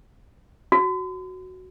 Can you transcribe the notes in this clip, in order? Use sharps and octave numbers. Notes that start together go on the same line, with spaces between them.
F#4